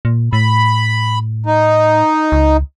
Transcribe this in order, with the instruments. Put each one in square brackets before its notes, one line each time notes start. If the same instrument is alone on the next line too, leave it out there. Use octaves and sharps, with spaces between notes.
[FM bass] A#2
[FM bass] A2 [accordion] B5
[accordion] D#4
[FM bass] C#2